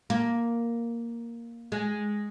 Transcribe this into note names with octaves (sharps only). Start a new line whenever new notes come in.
A#3
G#3